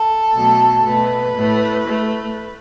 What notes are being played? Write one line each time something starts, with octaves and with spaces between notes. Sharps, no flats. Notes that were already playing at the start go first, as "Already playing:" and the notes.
Already playing: A4
B2 F#3 A3
B2 A3 B4
A2 A3
A3